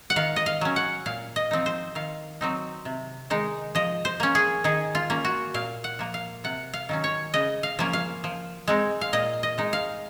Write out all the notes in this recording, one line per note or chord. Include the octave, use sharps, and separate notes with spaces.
F#5
D#3 F5
D#5
F5
F#3 C#4
F#5
A#2 F5
D#5
F3 C4 D#4
C5
D#3 F5
F#3 C4 D#4
C3
D#3 G#3 D#4
F3 D#5
C5
A#3 C#4
G#4
D#3 G#4
F4
A#3 C#4
F#4
A#2 F5
F#5
F3 A#3
F5
C3 F#5
F5
D#3 F#3 C#4
C#5
C#3 D#5
F5
F3 A#3 C#4
F5
F3
G#3 C4 D#4
F5
A#2 D#5
D#5
G#3 D#4
F5